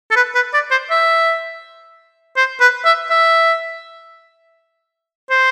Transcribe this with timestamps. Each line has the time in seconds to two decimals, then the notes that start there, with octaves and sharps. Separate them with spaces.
0.11 A4
0.16 B4
0.35 B4
0.54 D5
0.71 C5
0.90 E5
2.37 C5
2.60 B4
2.85 E5
3.09 E5
5.30 C5